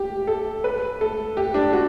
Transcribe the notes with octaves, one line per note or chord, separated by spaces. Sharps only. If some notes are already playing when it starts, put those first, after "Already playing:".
Already playing: G4
A4
B4
A4
G4
D4
F#4